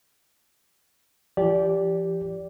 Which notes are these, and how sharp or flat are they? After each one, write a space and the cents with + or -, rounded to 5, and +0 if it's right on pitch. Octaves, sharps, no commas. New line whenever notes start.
F3 -40 G4 +0 D5 -20